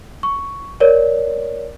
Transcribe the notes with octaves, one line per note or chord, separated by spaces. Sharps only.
C#6
A#4 C#5 D5